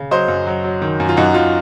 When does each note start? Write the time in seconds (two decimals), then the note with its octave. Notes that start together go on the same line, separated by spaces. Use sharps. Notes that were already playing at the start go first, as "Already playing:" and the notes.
Already playing: C#3
0.11 F#3 C5 D#5
0.28 F#2
0.47 F#3
0.64 F#3
0.82 D#3
1.00 F#2
1.09 F4
1.17 F#2 D#4 F#4
1.34 F#2 F4